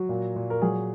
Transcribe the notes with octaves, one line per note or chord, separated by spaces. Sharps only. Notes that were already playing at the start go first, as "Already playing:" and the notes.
Already playing: F#3 F#4
A#2
A#2
A#4
F#3 G#4